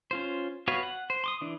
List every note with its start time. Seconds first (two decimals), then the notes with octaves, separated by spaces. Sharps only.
0.11 C#4 F4 C5
0.68 B3 F#4 B4 C#5 F5
0.83 F#5
1.10 C5
1.24 C6 D6 D#6
1.41 E3 D4